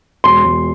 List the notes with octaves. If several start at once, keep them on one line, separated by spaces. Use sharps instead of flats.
E1 C6
E1